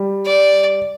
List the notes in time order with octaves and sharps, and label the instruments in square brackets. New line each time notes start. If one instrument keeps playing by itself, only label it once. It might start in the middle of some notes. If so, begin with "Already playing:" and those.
Already playing: [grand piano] G3
[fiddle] D5